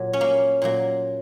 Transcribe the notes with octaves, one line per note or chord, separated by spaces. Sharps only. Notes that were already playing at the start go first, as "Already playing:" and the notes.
Already playing: A#2 F#3
C#4
A#3
A#2 F#3 A#3